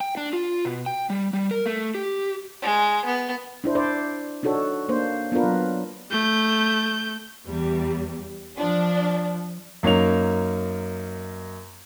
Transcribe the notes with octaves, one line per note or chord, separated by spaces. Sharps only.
G5
D4
F4
B2
G5
G3
G3
A#4
A3
G4
G#3
B3
D4 E4 C5
D4 C5 D5
D4 D#4 F#4 A4 C#5
A#3 D4 C5
B3 D4 F4 A#4 B4
F#3
A3 G6
E2 G3
F3 D4
F#2 A#3 C#4 D#4 F7